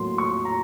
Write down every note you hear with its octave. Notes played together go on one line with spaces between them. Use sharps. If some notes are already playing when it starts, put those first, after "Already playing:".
Already playing: A2 F#3 A#3 C6
C#6
A#5